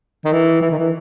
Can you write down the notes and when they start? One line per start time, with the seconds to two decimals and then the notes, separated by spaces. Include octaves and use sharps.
0.25 D#3
0.32 E3
0.61 E3
0.70 D#3
0.79 E3